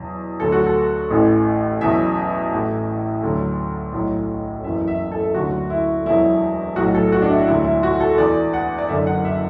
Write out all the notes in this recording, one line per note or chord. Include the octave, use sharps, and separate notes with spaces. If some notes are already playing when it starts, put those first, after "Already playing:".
Already playing: E2 B2 F#3
D2 D3 F#3 A4
F#4
A4
A1 A2 E3
E2 B2 F#3 E5
A1 A2 E3
D2 D3 F#3
B1 A2 F#3
F#1 E2 E3 E5
E5
A4
D2 D3 F#3 F#4
E4
E1 E2 B2 F#3 E4
B1 A2 F#3 F#4
A4
F#4
D4
E4
E1 D2 D3 F#3 E4
E4
F#4
A4
E2 E3 D5
F#5
D5
F#1 F#2 D3 E5
F#5
E5